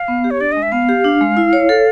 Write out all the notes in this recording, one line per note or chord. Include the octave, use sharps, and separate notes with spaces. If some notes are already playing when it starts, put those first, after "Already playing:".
Already playing: F5
B3
G4
C#5
D4 D5
G#3 D#5
E5
B3 F5
G4
D4
G#3
E4
C#5
A4